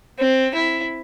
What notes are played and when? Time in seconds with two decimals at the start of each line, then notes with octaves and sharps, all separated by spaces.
0.19 C4
0.55 E4